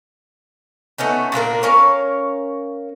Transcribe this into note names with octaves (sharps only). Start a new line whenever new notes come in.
A3 B3 C#4 D#4
A#2 A#3 D4 A#4
C#4 A#4 C#5 F5